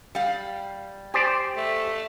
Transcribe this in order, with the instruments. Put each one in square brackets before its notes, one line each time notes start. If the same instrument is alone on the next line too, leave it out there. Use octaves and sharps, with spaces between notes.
[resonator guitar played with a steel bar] G3 F5
[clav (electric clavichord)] G4 C5 D5 [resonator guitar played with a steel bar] G#5
[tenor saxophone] A3